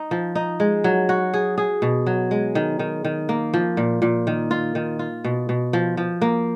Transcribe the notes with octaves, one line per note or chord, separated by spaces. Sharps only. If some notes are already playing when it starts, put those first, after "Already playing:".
Already playing: D#4
F3
D#4
G#3
F#3
F#4
G#4
G#4
B2
F#3
G#3
D#3
D#3
D#3
A#3
F3
A#2
A#2
D#3
F4
D#3
F4
B2
B2
F3
F3
A#3